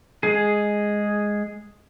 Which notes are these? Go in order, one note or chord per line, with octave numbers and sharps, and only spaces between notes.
G#3 G#4